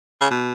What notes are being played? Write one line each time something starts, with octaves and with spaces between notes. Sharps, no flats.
C#3
B2